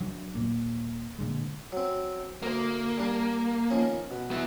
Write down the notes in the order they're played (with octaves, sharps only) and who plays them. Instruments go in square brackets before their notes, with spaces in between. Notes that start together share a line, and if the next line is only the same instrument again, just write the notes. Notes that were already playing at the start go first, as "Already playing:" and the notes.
[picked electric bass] F#3 D4
D#1 A#2 A#3
A#2 D3 G#3
[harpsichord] F#3 C4
[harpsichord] D2 A#4 C5 [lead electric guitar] A#3
[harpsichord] G3 D4
D#3 F3 C#4
B2
[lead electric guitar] B3 E4